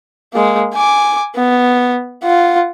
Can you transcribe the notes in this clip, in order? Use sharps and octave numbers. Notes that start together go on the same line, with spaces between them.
G#3 A#3
G#5 D6
B3
F4 F#5